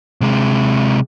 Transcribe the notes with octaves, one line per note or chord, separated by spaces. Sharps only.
C3 G#3